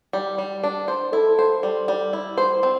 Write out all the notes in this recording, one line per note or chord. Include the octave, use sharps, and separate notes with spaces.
G3
G3
D4
C5
E4 A4
C5
G3
G3
E4
C5
C4